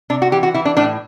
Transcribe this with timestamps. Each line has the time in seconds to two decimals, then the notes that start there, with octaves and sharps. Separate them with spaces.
0.10 C3 D4
0.22 F#4
0.32 E3 G4
0.43 F#4
0.54 E3 E4
0.65 D4
0.77 A2 D4